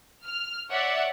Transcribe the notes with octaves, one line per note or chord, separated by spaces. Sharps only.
F6
C#5 D5 E5 F#5